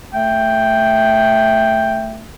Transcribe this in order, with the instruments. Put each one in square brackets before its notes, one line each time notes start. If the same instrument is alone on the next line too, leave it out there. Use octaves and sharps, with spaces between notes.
[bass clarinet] A3 [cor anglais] G5